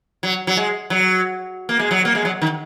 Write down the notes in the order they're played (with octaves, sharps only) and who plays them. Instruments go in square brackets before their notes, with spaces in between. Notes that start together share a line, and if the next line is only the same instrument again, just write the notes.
[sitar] F#3
F#3
G#3
F#3
A#3
G#3
F#3
A#3
G#3
F#3
D#3